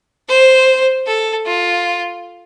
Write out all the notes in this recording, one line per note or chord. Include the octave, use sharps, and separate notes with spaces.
C5
A4
F4